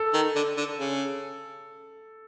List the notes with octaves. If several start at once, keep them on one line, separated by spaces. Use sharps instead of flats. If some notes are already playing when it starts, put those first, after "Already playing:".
Already playing: A4
D#3
D3
D3
C#3